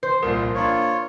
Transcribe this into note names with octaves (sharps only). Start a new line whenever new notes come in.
C5
C2 A#2 F3 A#4
A#3 D4 F4 C#5